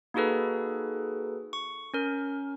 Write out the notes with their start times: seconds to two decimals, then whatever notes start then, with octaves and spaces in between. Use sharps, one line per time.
0.14 A#3 D#4 F#4 G#4 A4 B4
1.53 C#6
1.94 C#4 A#4